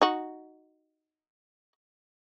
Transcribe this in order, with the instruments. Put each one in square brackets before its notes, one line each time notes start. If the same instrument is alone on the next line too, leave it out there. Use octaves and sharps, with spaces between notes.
[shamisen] D#4 F#4